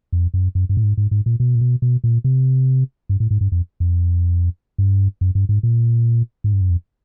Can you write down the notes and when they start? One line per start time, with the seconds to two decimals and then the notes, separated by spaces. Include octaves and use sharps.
0.13 F2
0.34 F#2
0.55 F#2
0.69 G2
0.77 A2
0.84 G#2
0.97 G#2
1.11 G#2
1.26 A#2
1.40 B2
1.55 A#2
1.61 B2
1.82 B2
2.04 A#2
2.24 C3
3.09 G2
3.20 A2
3.31 G#2
3.41 G2
3.52 F2
3.80 F2
4.78 G2
5.21 F#2
5.35 G2
5.49 G#2
5.63 A#2
6.44 G#2
6.53 G2
6.61 F#2
6.70 F2